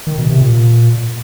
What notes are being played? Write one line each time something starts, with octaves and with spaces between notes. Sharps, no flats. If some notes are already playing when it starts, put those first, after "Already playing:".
D#3
B2
C3
A#2